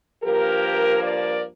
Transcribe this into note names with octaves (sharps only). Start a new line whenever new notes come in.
G2 F3 A#3 G4 A#4
A#4 D5